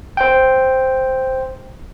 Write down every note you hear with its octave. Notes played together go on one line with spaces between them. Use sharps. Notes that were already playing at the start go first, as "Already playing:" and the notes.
C5 G5